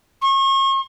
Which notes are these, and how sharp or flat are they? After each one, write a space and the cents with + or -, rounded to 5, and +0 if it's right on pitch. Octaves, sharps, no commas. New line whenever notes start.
C#6 -40